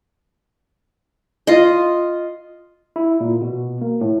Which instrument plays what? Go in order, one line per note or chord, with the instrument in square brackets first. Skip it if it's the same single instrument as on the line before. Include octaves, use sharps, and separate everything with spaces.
[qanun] F4 D#5
[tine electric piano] E4
A#2
B2
A#3
A2